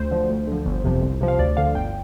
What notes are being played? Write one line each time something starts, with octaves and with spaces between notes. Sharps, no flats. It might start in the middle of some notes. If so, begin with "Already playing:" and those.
Already playing: D2 C5
D3 F3
D2
D3 F3
G1
F2 C3 F3
C2
C3 F3
F5
D2 D5
D3 F3 F5
G1 G5